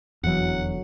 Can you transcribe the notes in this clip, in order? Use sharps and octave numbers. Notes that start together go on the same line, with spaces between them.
F1 E2 D3 E3 F#3 F#5